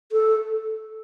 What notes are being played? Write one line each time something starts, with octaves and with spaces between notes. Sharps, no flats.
A4